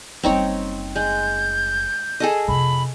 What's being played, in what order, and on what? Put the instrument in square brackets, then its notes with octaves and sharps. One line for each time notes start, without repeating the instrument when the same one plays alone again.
[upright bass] F#1 G3 [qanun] C4 D#4 C#5
[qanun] G#3 [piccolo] G6
[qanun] G#4 A4 D#5
[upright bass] F2 C3 [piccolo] B5